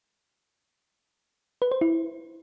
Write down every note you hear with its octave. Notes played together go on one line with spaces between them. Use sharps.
B4
C5
E4